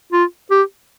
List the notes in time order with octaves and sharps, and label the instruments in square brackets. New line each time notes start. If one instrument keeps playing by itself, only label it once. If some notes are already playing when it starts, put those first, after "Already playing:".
[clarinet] F4
G4